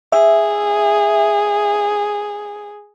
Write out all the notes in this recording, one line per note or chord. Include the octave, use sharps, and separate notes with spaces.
G#4 E5